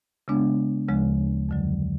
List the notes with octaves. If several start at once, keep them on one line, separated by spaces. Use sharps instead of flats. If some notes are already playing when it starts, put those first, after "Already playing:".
C#3 G#3 B3 D4
D2 C#3 F3 G#3
F2 D3 F#3